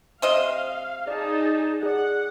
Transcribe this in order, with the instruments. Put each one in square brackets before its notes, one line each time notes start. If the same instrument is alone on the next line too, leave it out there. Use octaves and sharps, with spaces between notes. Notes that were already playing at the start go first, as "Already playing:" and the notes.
[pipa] C3 C5 D#5 [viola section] F5
[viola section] D#4 G#4 A5 [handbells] D5
[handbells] G#4 D5 [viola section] F#5